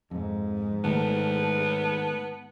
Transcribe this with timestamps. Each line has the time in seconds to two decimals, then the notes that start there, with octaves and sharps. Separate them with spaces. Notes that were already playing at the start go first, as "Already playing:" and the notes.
0.11 F2 G#2
0.84 D#3 A3 B3 A5